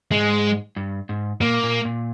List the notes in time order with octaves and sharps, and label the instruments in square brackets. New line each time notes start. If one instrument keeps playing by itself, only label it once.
[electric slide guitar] G#2 [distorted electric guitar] G#3
[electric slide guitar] G2
G#2
[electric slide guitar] A#2 [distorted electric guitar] A#3
[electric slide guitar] A#2
A#2